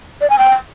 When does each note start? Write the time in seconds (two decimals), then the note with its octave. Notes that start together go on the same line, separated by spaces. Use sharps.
0.21 D5
0.30 G#5
0.39 G5